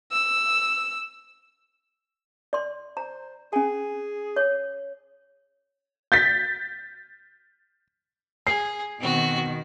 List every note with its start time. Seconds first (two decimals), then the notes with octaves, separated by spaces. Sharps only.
0.12 E6
2.53 D5 C6
2.97 C5 A#5
3.53 C#4 G#4 G#5
4.36 C#5
6.12 G6 A6 B6
8.47 G#4 C7
9.00 B2 D#3 C4 F#4